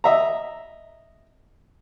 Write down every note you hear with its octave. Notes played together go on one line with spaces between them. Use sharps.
D#5 E5 A#5